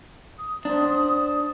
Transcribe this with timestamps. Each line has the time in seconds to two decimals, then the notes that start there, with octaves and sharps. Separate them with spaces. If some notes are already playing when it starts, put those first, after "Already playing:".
0.37 D#6
0.65 D4 C5